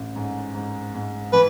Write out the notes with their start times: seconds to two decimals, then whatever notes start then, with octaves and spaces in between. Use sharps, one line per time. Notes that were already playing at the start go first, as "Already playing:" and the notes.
Already playing: A1
0.16 G#2
0.55 G#2
0.94 G#2
1.33 E3 B4